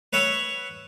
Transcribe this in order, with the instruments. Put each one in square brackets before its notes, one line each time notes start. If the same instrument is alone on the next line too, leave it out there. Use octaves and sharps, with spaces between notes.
[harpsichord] B4 C#5 E5 F#5 B5